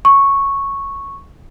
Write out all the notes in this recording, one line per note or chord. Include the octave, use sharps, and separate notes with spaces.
C#6